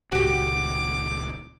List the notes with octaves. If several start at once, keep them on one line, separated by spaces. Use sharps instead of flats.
D#1 C#2 F#4 G4 D6